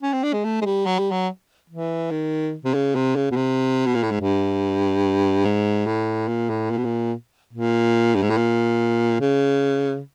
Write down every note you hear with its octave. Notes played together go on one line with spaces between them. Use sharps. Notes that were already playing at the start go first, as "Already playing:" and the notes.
C#4
C4
D4
G#3
A3
G#3
G3
F#3
G3
F#3
E3
D#3
C3
C#3
C3
C#3
B2
C3
B2
A#2
A2
G#2
G2
G#2
A2
A#2
A2
A#2
B2
A#2
A#2
G2
G#2
A2
A#2
C#3